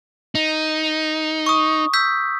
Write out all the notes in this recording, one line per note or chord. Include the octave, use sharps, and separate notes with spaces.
D#4
C#6 D#6
E6 G6 B6